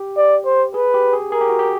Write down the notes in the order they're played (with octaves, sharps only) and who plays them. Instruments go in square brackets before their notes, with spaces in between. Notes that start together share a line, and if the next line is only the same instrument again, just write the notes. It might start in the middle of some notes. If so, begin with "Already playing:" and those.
Already playing: [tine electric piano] G4
[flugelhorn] D5
C5
[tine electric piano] G#4 [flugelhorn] B4
[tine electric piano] G4
G#4
[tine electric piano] G#4 [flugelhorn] A#4
[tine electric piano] G4
F#4
G4